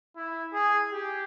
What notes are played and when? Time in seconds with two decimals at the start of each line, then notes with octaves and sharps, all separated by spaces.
0.17 E4
0.53 G#4
0.92 G4